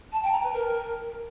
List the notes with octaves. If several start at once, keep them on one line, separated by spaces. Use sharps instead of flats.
A5
G5
A#5
B4
A#4